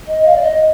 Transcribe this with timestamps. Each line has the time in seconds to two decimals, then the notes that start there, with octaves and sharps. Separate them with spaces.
0.07 D#5
0.26 F5
0.36 D5
0.42 D#5